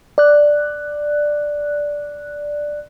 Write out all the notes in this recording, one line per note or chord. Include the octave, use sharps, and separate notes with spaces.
D5 F#6